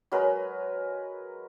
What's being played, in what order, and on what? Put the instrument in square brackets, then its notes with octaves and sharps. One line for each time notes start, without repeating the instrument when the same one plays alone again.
[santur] F#3 G#3 A#4 B4